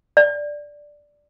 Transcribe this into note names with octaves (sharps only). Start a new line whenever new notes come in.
D5